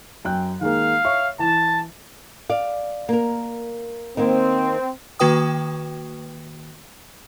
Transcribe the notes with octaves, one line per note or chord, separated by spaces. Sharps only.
F#2 G5 F#6
D#3 G#3 A#3 F5
C#5 E5 C#6
E3 A5
D5 F5
A#3 A#4
D#3 A#3 C4
D#3 A#3 F#4 B4 G5 D#6